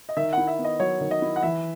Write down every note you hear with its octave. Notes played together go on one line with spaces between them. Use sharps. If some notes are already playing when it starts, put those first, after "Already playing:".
D#5
D#3 E5
E4 F#5
E5
B3
D#5
F#3 C#5
D#3
D#5
E4
F#5
E3 E5